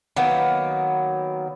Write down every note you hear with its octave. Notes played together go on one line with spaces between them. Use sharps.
D#3 F#3 A#3 B3